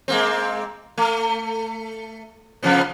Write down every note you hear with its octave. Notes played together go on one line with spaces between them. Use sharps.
G#3 A#3 C4
A3
C3 F3 B3